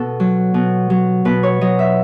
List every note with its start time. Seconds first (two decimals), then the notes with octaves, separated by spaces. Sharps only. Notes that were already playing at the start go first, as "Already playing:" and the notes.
Already playing: B2 A4
0.20 F#3
0.54 B2
0.90 F#3
1.25 B2 B4
1.43 C#5
1.61 F#3 D#5
1.79 E5